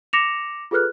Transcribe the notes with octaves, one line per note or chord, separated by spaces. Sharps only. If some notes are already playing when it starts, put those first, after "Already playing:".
D6 A#6 C#7 E7 F7
F4 G#4 A4 B4 F6 F#6